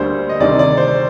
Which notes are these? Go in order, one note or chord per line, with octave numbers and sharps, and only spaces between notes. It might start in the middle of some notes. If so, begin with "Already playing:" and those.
Already playing: D2 D3 G3 A#3 C5
D#5
D2 C3 D#3 G3 D5
D5
C5